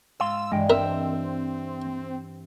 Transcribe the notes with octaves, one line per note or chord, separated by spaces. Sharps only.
G#2 F5 C6 E6
G2 E3 G#3 D#5 G5
C4 A#4 E5 E6